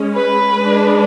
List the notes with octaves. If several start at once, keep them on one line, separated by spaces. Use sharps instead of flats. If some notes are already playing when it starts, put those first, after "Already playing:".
Already playing: G#3 C#4
B4
G#3 D4